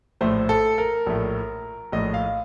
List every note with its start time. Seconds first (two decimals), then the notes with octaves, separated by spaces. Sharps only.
0.21 A#1 A2 A3 C5
0.49 A4
0.78 A#4
1.06 A#1 A2 A3
1.92 A#1 A2 A3 D#5
2.14 F5